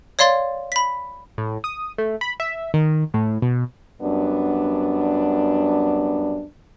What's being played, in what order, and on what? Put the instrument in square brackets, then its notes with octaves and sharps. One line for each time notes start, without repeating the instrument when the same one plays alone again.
[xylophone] C#5 D5 F5 C6 A6
B5 B6
[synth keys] A2
D#6
A3
B5
E5
D#3
A2
B2
[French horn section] F#2 G3 B3 D4